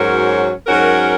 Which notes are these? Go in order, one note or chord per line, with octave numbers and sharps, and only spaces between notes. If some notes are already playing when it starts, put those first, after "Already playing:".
Already playing: G#2 F#3 C#4 F#4 A#4
G#2 F#3 C#4 F#4 A#4